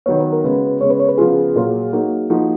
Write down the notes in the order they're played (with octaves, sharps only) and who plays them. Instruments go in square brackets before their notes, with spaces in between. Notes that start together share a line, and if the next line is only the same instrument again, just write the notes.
[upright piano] D#3 F#3 B3 [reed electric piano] C#5
[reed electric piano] B4
A#4
[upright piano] C#3 G#3 B3 F#4 [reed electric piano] B4
[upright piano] C#3 G#3 B3 [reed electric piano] C#5
[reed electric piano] B4
C#5
B4
[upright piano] C#3 F3 B3 F4 [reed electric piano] G#4
[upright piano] A#2 F#3 A#3 F4
F#3 A#3 D#4 F#4
F3 A#3 D#4 F#4